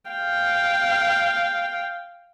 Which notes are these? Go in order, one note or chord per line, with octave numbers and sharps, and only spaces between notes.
F5 G5